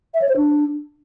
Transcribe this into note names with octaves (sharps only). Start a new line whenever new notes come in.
E5
C#5
C5
D4